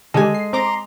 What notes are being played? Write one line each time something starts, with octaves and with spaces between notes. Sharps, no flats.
D3 D#3 G#3 G4 A4 G#5
C7
C4 A#5 C6 D6 A#6